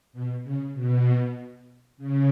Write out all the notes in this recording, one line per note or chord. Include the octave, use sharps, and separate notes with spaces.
B2
C#3
B2
C#3